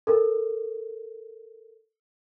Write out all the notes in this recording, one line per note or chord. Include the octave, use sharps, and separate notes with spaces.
A4 A#4